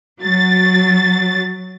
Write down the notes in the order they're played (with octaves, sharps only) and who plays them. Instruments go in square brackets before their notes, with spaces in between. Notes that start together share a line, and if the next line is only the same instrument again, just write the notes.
[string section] F#3 A6